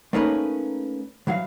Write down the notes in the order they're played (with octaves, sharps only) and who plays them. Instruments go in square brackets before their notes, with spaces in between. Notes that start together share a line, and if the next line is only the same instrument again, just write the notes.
[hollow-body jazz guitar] A3 A#3 C#4 D#4 A#4 B4
E3 F#3 F#4 F5